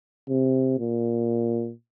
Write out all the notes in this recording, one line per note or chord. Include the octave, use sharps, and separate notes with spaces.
C3
A#2